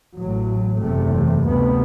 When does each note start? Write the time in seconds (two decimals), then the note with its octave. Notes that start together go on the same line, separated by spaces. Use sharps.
0.18 A1 A2 F#3
0.82 F#1 E2 C3 A3
1.47 D2 C3 B3